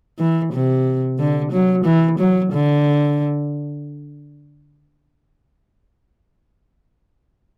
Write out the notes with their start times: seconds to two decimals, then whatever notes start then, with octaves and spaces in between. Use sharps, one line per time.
0.19 E3
0.53 C3
1.19 D3
1.52 F#3
1.85 E3
2.19 F#3
2.53 D3